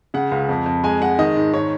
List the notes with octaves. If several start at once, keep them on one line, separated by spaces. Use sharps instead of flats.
C#3 F#5
C#2
F2
F2
G#3 G#5
G#3 F#5
D#3 D#5
G#2
D#3 C#5